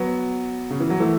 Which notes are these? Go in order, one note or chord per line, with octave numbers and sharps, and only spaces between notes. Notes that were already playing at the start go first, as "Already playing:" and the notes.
Already playing: F#3 B3
C#3
E3
F#3
E3 A3